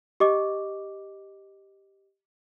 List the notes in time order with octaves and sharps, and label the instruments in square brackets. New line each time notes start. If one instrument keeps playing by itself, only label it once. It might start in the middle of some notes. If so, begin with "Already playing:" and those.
[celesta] G4 D#5 D6